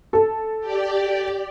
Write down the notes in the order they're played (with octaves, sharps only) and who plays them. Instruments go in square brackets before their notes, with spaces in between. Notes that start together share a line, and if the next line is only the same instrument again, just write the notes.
[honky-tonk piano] A4
[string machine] G4 D5